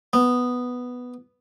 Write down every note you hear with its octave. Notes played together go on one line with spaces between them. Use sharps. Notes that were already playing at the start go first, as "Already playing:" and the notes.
B3